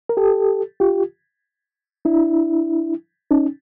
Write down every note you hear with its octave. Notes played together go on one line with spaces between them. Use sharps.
A#4
G4 A4
F4 G4
D4 E4
C#4 D#4